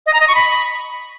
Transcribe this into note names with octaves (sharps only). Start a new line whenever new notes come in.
D#5
A#5
D#5
C#6
B5